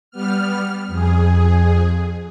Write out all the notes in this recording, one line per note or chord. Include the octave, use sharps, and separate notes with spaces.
G3 B3 F6
F2 G#4